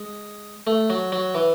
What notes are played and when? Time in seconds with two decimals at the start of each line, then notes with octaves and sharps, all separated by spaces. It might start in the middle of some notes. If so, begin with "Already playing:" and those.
Already playing: G#3
0.67 A3
0.90 F#3
1.12 F#3
1.35 E3